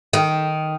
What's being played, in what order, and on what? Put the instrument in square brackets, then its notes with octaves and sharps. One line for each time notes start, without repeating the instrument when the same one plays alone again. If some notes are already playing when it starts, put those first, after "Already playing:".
[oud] D#3